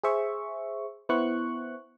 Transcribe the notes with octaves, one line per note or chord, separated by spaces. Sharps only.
G#4 C5 E5 C#6
B3 E4 C5 C#6 F#6